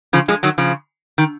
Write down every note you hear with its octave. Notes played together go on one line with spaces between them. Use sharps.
C#3 F3
F3 G#3
D#3 F#3
C#3 F3
D#3